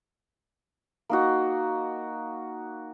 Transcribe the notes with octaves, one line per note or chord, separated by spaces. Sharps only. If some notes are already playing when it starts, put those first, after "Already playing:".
A#3 D#4 F#4